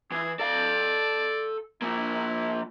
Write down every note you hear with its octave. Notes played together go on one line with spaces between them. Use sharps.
E3 G#4
A4 D5 F5
F3 A#3 E4